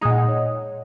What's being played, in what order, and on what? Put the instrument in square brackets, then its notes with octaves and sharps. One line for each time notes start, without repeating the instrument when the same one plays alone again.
[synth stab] A#2 G#3 D#4 [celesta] D#6
[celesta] F#5
D#5
C#5